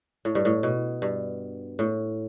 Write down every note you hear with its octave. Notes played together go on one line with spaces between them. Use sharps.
A2
G2
A2
B2
G2
A2